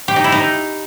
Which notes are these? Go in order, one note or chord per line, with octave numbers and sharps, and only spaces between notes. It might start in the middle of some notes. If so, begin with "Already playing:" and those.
G4
D#4
E4
D#4